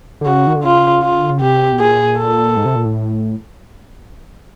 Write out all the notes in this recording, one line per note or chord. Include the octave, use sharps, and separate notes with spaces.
D3
C#3 F#4
D#3
D3
C#3 F4
F4
D3
C#3
C3 G4
B2
A#2 G#4
A4
G#2
C3
A#2
A2